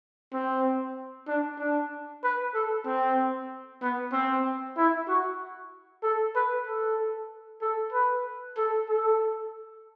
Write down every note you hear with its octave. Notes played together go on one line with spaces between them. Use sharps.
C4
D4
D4
B4
A4
C4
B3
C4
E4
F#4
A4
B4
A4
A4
B4
A4
A4